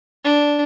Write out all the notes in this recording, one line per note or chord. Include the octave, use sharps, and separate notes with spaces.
D4